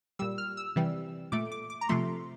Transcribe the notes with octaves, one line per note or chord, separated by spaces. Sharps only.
A#2 G3 E6
F6
E6
C3 E3 G3
A#2 A3 D6
D6
D6
A#5
C3 F3 A3 C6